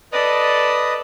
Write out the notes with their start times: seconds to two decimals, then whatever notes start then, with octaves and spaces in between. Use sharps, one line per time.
0.13 A4 B4 D5 D#5 D#6